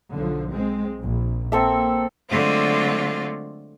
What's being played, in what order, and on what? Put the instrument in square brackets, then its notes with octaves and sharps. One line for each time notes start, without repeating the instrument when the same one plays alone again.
[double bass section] B1 D3 F3
G#3 C4
A#1
[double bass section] A#3 [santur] C4 A4 E5
[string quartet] D3 F#3 G#3 A3 C4 F4